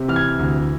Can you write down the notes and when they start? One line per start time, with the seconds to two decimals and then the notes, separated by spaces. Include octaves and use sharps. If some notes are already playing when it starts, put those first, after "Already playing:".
Already playing: C3
0.08 E3 F6
0.16 G#6
0.39 D2